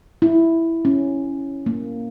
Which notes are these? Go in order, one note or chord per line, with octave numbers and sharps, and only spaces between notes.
E4
C#4
A#3